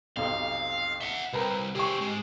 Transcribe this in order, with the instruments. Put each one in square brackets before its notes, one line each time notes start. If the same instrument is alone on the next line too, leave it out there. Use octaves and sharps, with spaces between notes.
[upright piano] B1 F2 C3 [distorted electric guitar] F5
[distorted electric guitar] E5 F#5 [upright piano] G7
[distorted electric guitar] C2 [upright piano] C4 A#4 B4
[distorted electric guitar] C4 G#4 [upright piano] G4 C#6
[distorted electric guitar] G#2 G#3